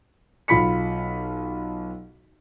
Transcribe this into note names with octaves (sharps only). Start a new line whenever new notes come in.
B1 F4 B5 B6 C#7